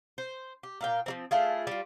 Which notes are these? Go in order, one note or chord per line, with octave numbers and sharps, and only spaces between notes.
C5
G4
A#2 F5 G5
F3 G3 C4
A3 E4 F4 G#4
G3 F4